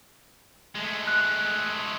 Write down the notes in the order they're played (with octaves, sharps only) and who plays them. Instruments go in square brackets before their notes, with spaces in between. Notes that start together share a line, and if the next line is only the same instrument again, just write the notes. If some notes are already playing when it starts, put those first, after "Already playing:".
[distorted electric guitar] G#3 A3
[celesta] F#6